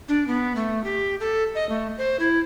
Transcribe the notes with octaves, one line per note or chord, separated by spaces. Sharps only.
D4
B3
A3
G4
A4
D#5
A3
C5
E4